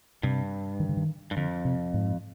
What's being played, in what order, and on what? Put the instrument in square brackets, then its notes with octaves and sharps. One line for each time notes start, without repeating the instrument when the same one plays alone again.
[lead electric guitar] G2 [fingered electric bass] C3
[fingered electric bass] D#3
D3
D#3
[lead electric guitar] G2
[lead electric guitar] F2 [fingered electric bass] D3
[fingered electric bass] C3
G#2